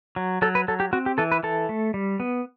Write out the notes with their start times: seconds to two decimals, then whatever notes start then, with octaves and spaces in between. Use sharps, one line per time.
0.16 F#3
0.42 F#3 A4
0.55 B4
0.68 F#3 A4
0.80 G4
0.93 C4 F#4
1.06 G4
1.18 E3 A4
1.32 B4
1.43 E3 A4
1.69 A3
1.94 G3
2.20 B3